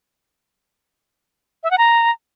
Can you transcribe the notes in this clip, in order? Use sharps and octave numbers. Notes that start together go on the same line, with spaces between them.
E5
F#5
A#5